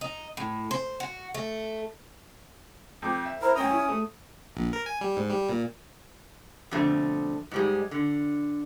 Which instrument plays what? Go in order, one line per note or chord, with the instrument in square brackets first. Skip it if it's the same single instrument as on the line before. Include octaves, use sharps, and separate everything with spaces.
[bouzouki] D#4
A2
C5
F#4
A3
[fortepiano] F2 D6 [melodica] G5
[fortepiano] E5
[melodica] E4 A#4 [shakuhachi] C5
[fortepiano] F#2 G5 A#5 [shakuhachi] C#4 [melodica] D#6
[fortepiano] E4
A3
[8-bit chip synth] A#1
A#4
G#5
G3
G#2
G3
A#2
[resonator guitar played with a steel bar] F2 B2 D3 A3
G#2 G3 G#3
D3